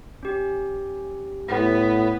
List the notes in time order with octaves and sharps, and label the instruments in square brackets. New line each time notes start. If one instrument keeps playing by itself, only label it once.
[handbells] C#4 G4
[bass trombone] A2 [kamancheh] B3